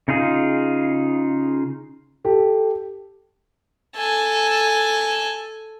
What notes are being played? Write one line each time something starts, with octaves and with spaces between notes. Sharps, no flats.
C#3 D#4 F4 G#4
G4 A4
A4 G#5